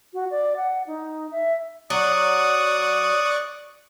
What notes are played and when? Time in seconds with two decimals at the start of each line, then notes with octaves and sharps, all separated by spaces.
0.13 F#4
0.30 D5
0.56 F#5
0.87 D#4
1.31 E5
1.90 F#3 D5 C#6 D#6 F#6